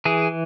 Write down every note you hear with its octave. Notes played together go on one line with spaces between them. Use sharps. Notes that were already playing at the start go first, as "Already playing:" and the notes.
E3 G#4